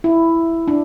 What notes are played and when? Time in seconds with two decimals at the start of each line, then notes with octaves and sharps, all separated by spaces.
0.04 E4
0.68 D4